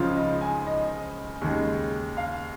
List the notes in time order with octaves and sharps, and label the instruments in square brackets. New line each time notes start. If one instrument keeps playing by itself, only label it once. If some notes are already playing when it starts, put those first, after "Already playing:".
Already playing: [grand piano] C#2 C#3 F3 G#3 F4
D#5
G#5
D#5
D#2 C#3 G#3
F5